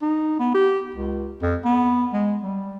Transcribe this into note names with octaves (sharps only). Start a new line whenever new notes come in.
D#4
B3
G4
C#2
F2
B3
G#3
G3